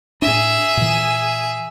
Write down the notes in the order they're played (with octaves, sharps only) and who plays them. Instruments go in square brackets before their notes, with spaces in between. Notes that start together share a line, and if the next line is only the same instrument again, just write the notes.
[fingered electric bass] A2 D4 [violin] G#4 E5
[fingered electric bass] A#2 E3